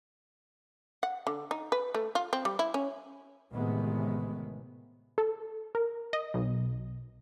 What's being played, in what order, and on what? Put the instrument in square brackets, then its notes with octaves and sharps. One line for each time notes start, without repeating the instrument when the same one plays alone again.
[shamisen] F#5
D3
D#4
B4
A3
F4
C4
G3
E4
C#4
[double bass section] A1 A2 C3 D#3 G#3 B3
[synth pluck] A4
A#4
D#5
B1